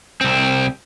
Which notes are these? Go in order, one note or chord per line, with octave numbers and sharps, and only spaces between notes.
C2 C4